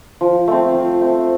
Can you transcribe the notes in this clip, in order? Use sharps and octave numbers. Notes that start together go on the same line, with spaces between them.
F3
A3 C4
F3
A3 C4